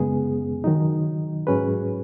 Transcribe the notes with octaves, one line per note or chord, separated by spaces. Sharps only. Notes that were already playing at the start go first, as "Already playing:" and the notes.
Already playing: F#2 C#3 G#3 B3 G#4
D#3 F#3 D#4
G#2 F#3 C#4 G#4 B4